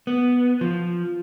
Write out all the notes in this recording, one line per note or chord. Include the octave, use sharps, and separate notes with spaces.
B3
F3